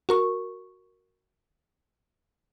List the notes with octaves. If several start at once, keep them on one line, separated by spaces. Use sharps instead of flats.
F#4 A#4 C#6